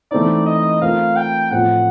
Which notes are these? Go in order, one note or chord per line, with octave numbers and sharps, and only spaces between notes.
E3 A3 C4 D#4 D5
D#5
A3 C4 F4 A#4 F5
G5
A2 F3 A3 C4 F4 F#5